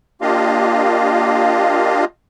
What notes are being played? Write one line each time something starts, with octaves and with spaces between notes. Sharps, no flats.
A#3 D4 F4 G4 D#5 F5